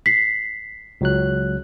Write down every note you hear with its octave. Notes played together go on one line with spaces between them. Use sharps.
B6 C7
C#2 F#3 F#6